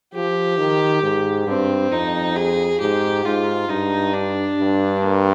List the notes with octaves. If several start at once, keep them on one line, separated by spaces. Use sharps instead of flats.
F3 G4
D#3
G#2
G2 C4
F2 D#4
G#4
G#2 G4
G#2 F4
G2 D#4
D4
G2
A#3